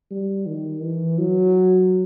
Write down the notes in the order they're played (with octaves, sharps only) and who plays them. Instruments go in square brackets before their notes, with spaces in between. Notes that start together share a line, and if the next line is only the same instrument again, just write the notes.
[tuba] G3
D#3
E3
F#3